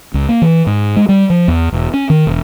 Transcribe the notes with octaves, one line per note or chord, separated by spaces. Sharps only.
C#2
A#3
E3
G#2
G#3
G3
F3
E2
E1
C#4
D#3
E1